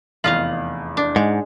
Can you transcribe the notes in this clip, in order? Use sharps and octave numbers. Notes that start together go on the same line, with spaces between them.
F1 E2 F4 D#5 F5 F#7
D4
G#2 G#3